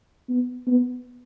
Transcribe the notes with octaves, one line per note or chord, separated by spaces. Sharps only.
B3
B3